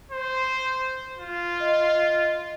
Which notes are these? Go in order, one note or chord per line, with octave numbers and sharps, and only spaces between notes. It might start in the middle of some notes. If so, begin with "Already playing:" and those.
C5
F4
D#5